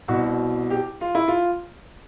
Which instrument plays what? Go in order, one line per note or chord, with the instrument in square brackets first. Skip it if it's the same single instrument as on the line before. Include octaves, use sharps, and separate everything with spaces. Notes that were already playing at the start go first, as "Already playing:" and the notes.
[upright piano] C2 B2 F#4
G4
F4
E4
F4